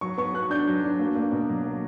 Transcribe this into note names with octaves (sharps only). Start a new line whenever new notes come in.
F#3 C#6
B3 C#6
B3 F#6
D4 G6
F#3
D4
A#3
A#3
B2
F#3
A#3